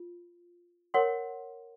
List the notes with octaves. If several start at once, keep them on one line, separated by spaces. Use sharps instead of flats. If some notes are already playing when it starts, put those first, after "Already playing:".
Already playing: F4
A#4 C#5 F#5 C6